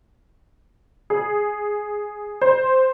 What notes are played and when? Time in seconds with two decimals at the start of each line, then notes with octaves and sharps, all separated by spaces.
1.10 G#4
2.42 C5